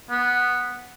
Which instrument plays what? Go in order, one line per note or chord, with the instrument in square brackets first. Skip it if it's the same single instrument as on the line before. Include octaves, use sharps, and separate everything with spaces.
[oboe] B3